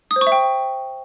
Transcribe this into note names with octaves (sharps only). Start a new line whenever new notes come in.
D#6
C5
C#6
E5
G5